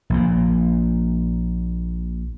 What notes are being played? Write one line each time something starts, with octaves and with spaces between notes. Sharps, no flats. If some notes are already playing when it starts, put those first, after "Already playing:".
A#1 A#2